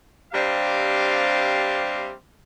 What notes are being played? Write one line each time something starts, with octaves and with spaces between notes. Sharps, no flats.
C3 G3 C4 D4 F5